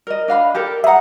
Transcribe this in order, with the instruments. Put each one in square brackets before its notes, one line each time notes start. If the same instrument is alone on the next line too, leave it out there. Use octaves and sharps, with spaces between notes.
[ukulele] A#4 D#5
D4 F5 B5
G4 A4 A#4
[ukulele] G#4 F#5 [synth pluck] E5 A#5